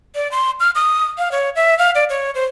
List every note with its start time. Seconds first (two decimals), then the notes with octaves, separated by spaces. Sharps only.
0.16 D5
0.31 C6
0.60 F6
0.75 D#6
1.18 F5
1.31 C#5
1.56 E5
1.78 F5
1.95 D5
2.10 C#5
2.35 C5